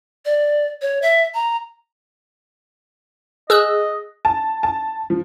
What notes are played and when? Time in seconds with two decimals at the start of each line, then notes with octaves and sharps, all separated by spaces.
0.25 D5
0.82 C#5
1.02 E5
1.34 A#5
3.50 G#4 D#5 E6 F#6
4.25 A5
4.63 A5
5.10 F3